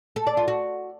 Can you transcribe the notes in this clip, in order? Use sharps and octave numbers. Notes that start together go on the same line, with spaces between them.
A4
D5
F4
F#4